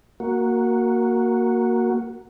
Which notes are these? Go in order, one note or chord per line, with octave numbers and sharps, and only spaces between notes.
A#3 F#4